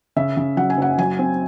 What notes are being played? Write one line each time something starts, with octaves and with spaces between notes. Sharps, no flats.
C#3 E5
C#3
F#3 F#5
G#5
F#1 F#5
F#3 G#5
C4